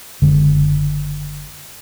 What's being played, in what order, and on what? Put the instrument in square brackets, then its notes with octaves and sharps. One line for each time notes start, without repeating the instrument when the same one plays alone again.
[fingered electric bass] F#1 D3 G#3